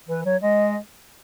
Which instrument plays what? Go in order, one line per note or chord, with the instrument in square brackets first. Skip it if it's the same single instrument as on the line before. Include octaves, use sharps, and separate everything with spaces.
[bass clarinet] E3 [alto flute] B4
[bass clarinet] F#3 [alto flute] C#5
[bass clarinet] G#3 [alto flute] D#5